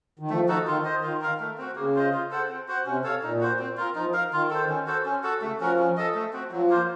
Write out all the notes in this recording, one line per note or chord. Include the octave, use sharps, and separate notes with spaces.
D#3
F3 A3
D#4 F#4 A4
D#3 F4
C5 D#5
D#3 F4
A#4 F5
A3
C4 F#4
C#3 A#3
F4 C5 D#5
F4
A4 C5 F#5
C4
F#4 C5 F#5
C3 C#4
A4 C#5 F5
A#2 D#4
F#4 C5
C4
F4 A#4
F3 D#4
A#4 F5
D#3 F4
A4 C5
C#4
F#4 A4 C5
C#4
F#4 A4
C#3 A3
F3 C#4 F#4 A#4
C#4
A4 D#5
A3
C4 F#4
F3 F#3
A#3 F4 C5